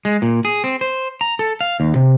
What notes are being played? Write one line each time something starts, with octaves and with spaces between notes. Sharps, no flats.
G#3
A#2
G#4
C4
C5
A#5
A4
F5
D#2
C3